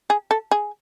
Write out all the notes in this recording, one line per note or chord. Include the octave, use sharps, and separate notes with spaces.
G#4
A4
G#4